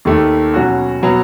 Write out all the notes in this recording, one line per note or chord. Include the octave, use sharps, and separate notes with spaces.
D#2 D#3 A3
B2 F#3 C#4 F#4
B2 F#3 B3